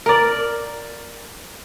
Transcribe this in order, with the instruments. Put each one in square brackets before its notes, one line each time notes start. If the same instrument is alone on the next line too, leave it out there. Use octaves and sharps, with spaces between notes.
[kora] A#4 D5